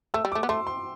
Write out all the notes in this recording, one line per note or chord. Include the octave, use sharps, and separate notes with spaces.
A3 E6
G3
A3 D6
B3
A3 C6
C6